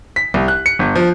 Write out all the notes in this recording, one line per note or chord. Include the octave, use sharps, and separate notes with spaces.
B6
C2
F#6
C#7
G1
F3